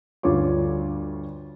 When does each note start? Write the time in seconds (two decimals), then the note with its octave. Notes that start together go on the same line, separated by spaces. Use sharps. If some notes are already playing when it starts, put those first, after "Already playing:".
0.23 D2 G2 F4 C#5 D6